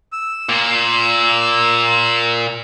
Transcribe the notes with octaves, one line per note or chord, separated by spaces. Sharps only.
E6
A#2